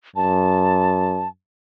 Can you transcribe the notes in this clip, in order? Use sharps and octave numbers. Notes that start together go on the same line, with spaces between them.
F#2 A5